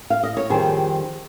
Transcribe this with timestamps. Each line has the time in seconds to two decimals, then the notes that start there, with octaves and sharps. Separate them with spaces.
0.10 F5
0.23 D#5
0.37 C#5
0.50 F2 D#3 G3 G#4 C5